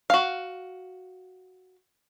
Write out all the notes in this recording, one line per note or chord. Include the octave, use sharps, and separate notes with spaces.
F#4 F5